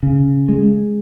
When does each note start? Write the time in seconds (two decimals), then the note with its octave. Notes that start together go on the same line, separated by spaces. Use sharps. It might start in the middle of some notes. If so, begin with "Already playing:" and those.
0.03 C#3
0.49 G#3